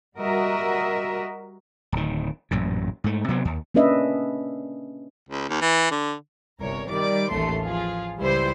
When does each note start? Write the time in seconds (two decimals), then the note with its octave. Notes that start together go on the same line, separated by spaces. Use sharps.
0.17 G3 F#4 A#4 D#5 E5
1.92 D1 D#3
2.51 A1 F#2 A#2
3.04 G#2 A3
3.28 C3 F#3 B3 C4
3.45 D#2
3.74 A#3 C#4 D4 B4 D#5 E5
5.29 C#2
5.49 D#2
5.61 E3
5.91 D3
6.59 G1 C2 A#4 C#5
6.89 D#3 G3 D5 D6
7.29 A1 D#2 A3 C6
7.62 F3 F4 G#4
8.19 C#2 G3 E4 G4 C5 C6